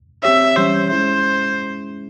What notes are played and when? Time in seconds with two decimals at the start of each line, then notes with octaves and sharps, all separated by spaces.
0.23 C4 G4 C#5 E5
0.57 E3 G3 C#4 G4 C5 C#5
0.90 G#3 C#4 E4 G#4 C5 E5